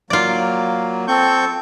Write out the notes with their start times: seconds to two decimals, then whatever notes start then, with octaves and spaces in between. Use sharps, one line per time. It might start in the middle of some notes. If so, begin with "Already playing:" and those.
0.10 F#3 A#3 F4 D5
1.08 C4 A4 C#6 G6